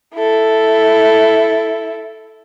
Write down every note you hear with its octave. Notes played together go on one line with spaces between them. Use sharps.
E4 A4